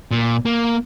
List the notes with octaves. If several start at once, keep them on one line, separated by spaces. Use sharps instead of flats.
A#2
A#3